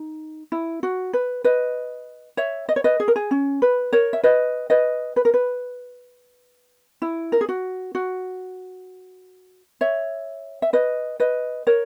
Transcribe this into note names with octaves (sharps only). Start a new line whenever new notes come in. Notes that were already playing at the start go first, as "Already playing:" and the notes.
Already playing: D#4
E4
F#4
B4
B4 D#5
C#5 E5
D#5
C#5
B4 D#5
G#4
A#4
G#4
C#4
B4
A#4 C#5
E5
B4 D#5
B4 D#5
B4
A#4
B4
E4
A#4
G#4
F#4
F#4
C#5 E5
E5
B4 D#5
B4 D#5
A#4 C#5